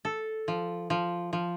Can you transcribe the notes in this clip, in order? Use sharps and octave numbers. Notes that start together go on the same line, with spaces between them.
A4
F3
F3
F3